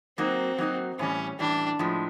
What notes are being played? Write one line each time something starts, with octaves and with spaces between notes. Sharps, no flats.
F#3 A#3 C4 D#4 F#4
F#3 A#3 D#4 F#4
A2 E3 G3 C#4
A2 E3 G3 D4
A2 F3 G#3